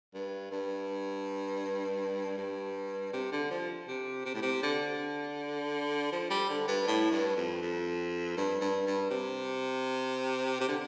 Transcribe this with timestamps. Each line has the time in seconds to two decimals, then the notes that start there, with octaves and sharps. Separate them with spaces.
0.14 G2
0.51 G2
2.38 G2
3.13 C3
3.32 D3
3.51 F3
3.88 C3
4.25 C3
4.34 A2
4.42 C3
4.63 D3
6.12 F3
6.30 G3
6.50 D3
6.68 G2
6.87 A2
7.11 G2
7.37 F2
7.62 F2
8.37 G2
8.61 G2
8.87 G2
9.11 C3
10.61 C3
10.68 D3